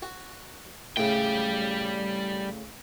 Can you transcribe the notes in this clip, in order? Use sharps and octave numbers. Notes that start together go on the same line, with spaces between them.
F#4
A2 C#3 G3 G5